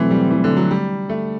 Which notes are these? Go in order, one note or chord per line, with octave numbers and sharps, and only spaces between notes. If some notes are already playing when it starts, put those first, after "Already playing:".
Already playing: B2 E3 F#3 A3 C4
G3
E3
D3
F#3
G3
A3